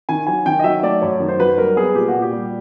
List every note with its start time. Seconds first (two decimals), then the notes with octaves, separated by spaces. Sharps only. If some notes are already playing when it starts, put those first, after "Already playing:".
0.09 D#3 G#5
0.27 F#3 G#5
0.46 D#3 G5
0.60 D#5
0.64 F#3 E5
0.83 A3 D5
1.01 F#2 C#5
1.20 D#3
1.28 C5
1.40 F#3 B4
1.57 G3 A#4
1.76 B3 G#4
1.95 A#2 G4
2.08 F#4
2.14 A#2
2.22 G4
2.33 G3